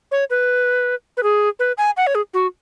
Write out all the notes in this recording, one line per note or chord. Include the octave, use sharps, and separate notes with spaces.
C#5
B4
B4
G#4
B4
G#5
F#5
C#5
G#4
F#4